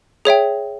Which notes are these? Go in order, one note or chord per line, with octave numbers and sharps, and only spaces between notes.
G#4 C#5 E5 G5